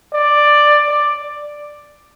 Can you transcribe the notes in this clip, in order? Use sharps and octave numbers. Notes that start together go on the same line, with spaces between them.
D5
D5